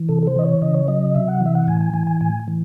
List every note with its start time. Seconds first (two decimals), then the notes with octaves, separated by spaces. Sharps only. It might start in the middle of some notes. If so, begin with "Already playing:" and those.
Already playing: E3
0.09 C3 A4
0.23 A4
0.27 C5
0.36 E3 D#5
0.44 C#5
0.62 C#3 D#5
0.74 C#5
0.88 F#3 D#5
1.15 C3 E5
1.28 F#5
1.41 E3 E5
1.55 F#5
1.67 A2 G#5
1.81 G#5
1.94 E3 G#5
2.07 G#5
2.21 A2 G#5
2.48 E3